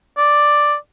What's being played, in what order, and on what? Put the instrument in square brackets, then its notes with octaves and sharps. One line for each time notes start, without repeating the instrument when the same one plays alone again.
[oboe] D5